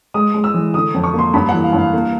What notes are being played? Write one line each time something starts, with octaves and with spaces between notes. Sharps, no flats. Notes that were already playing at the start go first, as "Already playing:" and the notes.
G#3 D#6
G#3
E6
E3
D3 D#6
F2
C#6
A#3 C6
G2 B5
E3 F#5
F5
G2
F5
A#3